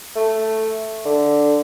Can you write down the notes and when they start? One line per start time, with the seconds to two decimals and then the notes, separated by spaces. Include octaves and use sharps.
0.15 A3
1.05 D3